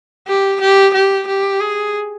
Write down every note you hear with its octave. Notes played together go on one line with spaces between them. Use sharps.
G4
G4
G4
G4
G#4